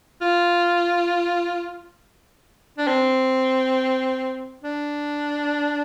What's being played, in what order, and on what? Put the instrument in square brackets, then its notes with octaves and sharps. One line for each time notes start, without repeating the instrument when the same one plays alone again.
[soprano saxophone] F4
D4
C4
D4